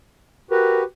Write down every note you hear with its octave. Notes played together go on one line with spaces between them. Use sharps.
F#4 G4 A#4 B4